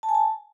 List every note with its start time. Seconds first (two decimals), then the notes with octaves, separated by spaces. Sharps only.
0.03 A5
0.09 G#5
0.15 A5